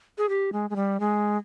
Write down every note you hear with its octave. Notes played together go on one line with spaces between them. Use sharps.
G#4
G4
G#3
G#3
G3
G#3